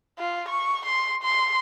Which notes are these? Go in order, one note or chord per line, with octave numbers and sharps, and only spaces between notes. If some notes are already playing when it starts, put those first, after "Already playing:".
F4
C#6
C6
C6